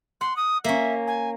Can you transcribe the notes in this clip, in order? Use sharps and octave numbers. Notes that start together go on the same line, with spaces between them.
F#5 C6
D#6
A#3 C#4 E5
G#5